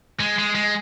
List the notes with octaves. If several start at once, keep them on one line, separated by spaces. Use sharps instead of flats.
G#3
G#3
G#3